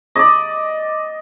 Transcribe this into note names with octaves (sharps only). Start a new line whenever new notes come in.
D5 D#5